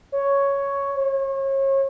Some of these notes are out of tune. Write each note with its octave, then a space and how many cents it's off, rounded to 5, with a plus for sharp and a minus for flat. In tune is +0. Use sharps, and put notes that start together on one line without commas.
C#5 +5
C#5 -35